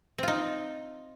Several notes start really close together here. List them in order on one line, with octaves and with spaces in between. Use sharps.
C4 F4 D#4